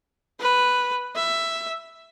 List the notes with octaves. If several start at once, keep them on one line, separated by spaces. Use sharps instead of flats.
B4
E5